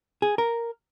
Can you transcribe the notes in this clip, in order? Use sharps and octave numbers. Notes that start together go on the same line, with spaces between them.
G#4
A#4